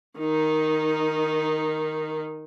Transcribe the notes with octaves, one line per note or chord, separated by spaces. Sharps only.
D#3 D#4